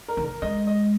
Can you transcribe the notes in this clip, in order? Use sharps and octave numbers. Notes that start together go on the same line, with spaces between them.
A#4
D#3
A#4
G#3 D#5
D#5